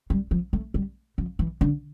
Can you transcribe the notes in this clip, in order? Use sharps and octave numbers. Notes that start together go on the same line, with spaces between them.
G3
F3
A3
G3
F3
E3
D3